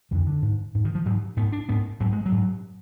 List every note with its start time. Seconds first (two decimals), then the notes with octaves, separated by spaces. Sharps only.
0.11 F2 D3 F3
0.27 D3
0.42 G#2
0.75 G#2
0.85 D#3
0.95 F3
1.05 G#2 F#3
1.37 G#2 B3
1.52 D4
1.69 G#2 B3
2.00 G#2 F#3
2.12 G#3
2.26 F#3
2.32 G#2